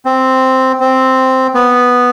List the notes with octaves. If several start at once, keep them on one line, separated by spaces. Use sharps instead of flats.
C4
C4
B3